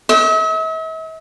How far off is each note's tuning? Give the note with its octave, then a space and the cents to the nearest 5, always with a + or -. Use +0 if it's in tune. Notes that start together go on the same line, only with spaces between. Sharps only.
E5 -45